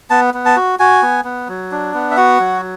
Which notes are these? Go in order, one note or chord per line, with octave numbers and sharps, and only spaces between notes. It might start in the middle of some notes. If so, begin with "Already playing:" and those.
B3 A5
B3
A5
F#4
F#4 G#5
B3
B3
F#3
D4
B3
E5
F#4 F#5
F#3